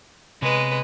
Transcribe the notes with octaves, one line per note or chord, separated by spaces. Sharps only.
C3 G#3 B3 B4 C#5